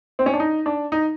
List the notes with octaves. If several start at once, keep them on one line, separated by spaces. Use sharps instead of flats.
C4
C#4
D4
D#4
D4
D#4